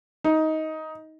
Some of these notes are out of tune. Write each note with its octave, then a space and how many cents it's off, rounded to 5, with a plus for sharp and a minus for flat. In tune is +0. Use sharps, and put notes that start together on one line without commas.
D#4 +15